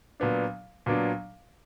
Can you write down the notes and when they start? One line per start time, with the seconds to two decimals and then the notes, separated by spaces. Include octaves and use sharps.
0.20 A#2 F#3 B3 D4
0.86 A#2 F#3 B3 D4